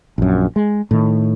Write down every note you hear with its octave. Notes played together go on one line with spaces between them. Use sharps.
A#1 F#2
G#3
A2 D#3